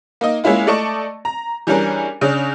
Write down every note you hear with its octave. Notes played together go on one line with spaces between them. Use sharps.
A#3 D#4 D#5
G#3 A#3 C#4 E4 F4
A3 D5 D#5 A5 C#6
A#5
E3 G3 C#4 D4 G#4 A#4
C#3 C#4 D4